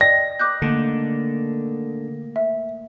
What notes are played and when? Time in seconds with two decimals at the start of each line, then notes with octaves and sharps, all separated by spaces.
0.01 D5 D#5 G5 A#6
0.39 B4 D#5 D6 F#6 G6
0.62 A#2 D3 D#3 A3
2.36 E5